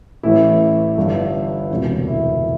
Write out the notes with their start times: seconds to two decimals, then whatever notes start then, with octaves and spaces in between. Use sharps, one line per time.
0.23 A1 A2 E3 E4
0.97 G1 G2 E3
1.70 E1 D2 C3 E3
2.08 E4